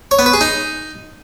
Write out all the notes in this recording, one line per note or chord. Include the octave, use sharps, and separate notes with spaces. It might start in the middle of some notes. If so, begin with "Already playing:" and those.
C#5
B3
B4
G#4
D#4